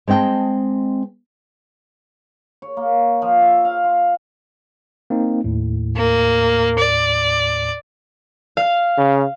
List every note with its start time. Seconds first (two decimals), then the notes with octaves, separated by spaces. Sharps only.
0.08 G#3 C4 D#5 G5 A5
2.62 C#5
2.77 A#3
3.22 F3
3.41 E5
3.65 F5
3.84 F4
5.10 A#3 C4 D#4
5.44 D#2 A2
5.96 A#3
6.79 D5
8.57 F5
8.98 C#3